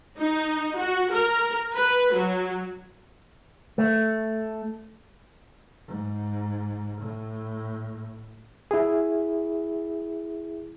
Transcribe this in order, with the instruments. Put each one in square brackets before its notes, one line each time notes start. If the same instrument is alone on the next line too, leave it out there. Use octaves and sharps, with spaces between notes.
[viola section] D#4
F#4
A#4
B4
F#3
[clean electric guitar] A3
[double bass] G#2
A2
[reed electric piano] E4 G#4